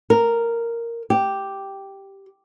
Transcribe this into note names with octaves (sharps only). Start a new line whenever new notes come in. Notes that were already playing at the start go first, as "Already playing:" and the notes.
A#4
G4